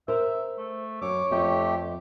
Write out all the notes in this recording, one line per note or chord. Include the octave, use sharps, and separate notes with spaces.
A#4 C5 E5
A3
F#2 C#5 D6
F2 A3 G4